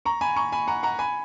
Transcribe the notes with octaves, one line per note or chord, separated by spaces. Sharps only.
A#5 C#6
G#5 B5
A#5 C#6
G#5 B5
F#5 A#5
F#5 A#5
G#5 B5